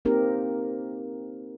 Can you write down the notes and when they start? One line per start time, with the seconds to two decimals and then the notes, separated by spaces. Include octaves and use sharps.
0.05 A#3 C4 D#4 G4 A#4